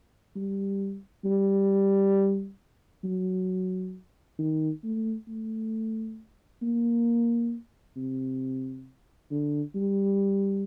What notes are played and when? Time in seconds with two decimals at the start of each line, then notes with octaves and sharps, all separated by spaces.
0.36 G3
1.25 G3
3.04 F#3
4.38 D#3
4.83 A3
5.28 A3
6.62 A#3
7.96 C3
9.31 D3
9.75 G3